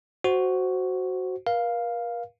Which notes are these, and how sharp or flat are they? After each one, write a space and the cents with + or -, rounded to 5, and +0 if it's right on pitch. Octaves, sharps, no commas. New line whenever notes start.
F#4 +5 C5 +0
A#4 +40 F5 +0